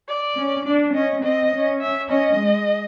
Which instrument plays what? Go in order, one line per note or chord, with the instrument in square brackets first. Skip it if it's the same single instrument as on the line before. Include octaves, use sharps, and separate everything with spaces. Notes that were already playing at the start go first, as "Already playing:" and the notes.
[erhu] D5
[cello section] C#4
D4
[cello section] C#4 [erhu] D#5
[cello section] C4 [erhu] D#5
[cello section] C#4
[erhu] E5
[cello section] C#4 [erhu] D#5
[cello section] G#3